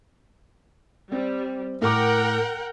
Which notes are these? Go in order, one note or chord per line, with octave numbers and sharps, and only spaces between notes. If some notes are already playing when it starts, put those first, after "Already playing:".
G3 C4
A2 A#4 F#5 G5 D6